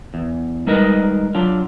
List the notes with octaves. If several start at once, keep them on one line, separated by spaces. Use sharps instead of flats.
E2
G3 G#3 D#4 A#4 B4 D#5
F#3 D4 F4